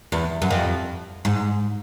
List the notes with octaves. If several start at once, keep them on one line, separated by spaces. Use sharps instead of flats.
E2
F#2
F2
G#2